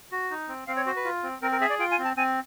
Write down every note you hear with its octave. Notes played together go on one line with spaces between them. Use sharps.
F#4
D#4
C4
C4 F5
C#5
F#4 C5
B4
F4
C4
C4 A#4
A#4
G#4 E5
D5
F4 G5
G#5
C4
A5
C4 G#5